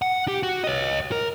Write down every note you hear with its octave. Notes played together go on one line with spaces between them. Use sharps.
F#5
G4
F#4
C#5 D#5
A#4